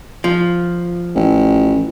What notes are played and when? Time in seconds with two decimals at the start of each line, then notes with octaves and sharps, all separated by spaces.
0.24 F3
1.15 A1